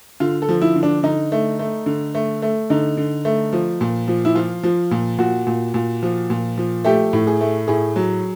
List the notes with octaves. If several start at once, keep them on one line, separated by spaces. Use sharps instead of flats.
D3 F4
A4
F3
E4
D3
D4
D3 D#4
A3
A3
D3
A3
A3
D3 D#4
D3
A3
F3
A#2
F3
E4
F3 F4
F3
A#2
A#2 F#4
A#2
A#2
F3
A#2
F3
A3 G4
A2
G#4
A3
A2 G#4
F#3